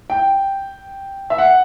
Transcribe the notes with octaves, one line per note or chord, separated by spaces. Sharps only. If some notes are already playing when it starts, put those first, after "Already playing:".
G5
E5
F#5